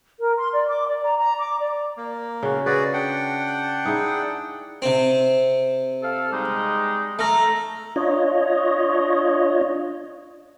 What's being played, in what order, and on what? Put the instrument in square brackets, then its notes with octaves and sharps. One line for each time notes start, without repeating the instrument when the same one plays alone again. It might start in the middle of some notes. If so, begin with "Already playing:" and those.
[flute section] A#4
C6
D5
D6
D5
A#5
A#5
D6
D5
[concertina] A#3
[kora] C#3 F#4
[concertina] F#4 G#4 D5 [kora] B4
[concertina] D4 F#5 G5
[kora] D#4 E4 G#4
[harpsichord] C3 C4
[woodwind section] A4 F5
G3 G#3 D#4
[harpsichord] A3 [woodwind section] A4 A#5
[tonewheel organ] D4 F4 C#5 D#5